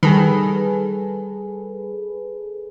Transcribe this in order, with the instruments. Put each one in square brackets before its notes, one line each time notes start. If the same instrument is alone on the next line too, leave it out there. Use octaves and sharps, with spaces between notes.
[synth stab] D#3 [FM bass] G3 [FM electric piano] G#4 A4 B4